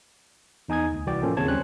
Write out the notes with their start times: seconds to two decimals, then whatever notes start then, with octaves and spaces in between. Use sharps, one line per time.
0.69 E2 D#4 G#5 D#6 G#6
0.92 D2
1.06 C2 E3 F#4 D5 G5
1.22 A2 F3 A#3 C#4 F4 A4
1.37 D#2 C#3 C4 C#5 A5 G#6
1.48 C#2 G3 C#4 C5 C#5 F#6